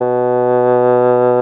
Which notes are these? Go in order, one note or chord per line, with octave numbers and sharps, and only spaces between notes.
B2